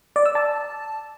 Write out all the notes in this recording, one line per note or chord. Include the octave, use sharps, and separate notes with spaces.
D5
E6
A5